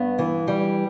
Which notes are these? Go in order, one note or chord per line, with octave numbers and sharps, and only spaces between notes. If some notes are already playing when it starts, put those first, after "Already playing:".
Already playing: G2 B3
E3
G3